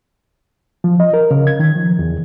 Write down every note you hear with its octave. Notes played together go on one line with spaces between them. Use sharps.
F3
D#5
A#4
C#3
G#6
D#3
F3
E2